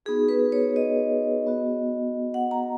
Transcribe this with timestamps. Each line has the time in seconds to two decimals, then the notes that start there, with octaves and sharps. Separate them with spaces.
0.06 B3 D#4 F#4 G#4
0.29 B4
0.52 C#5
0.76 D#5
1.46 B3 F#4
2.34 F#5
2.51 A#5